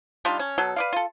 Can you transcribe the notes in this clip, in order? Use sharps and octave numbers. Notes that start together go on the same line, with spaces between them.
G3 D4 D#4 F4
C#4
B2 F#3 A4
B4 D5 F5
F4 A4